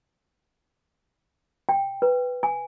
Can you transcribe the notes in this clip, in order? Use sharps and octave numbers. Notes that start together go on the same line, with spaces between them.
G5
B4
G#5